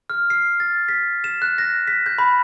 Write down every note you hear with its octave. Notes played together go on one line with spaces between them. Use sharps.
F6
C7
A6
B6
E7
F#6
A#6
B6
G6
B5